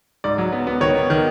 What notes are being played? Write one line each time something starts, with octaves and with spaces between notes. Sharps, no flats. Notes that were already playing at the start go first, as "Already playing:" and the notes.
G#2 D5
F#3
B3
B3
D#3 C#5
B3
D#3